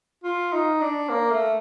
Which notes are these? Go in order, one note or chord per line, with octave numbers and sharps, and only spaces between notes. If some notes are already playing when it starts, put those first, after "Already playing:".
F4
D#4
D4
A#3
A3